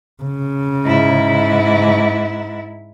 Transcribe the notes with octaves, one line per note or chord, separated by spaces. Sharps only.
C#3
G#2 E4